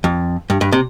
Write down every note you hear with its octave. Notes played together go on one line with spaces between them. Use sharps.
F2
G2
G2
C3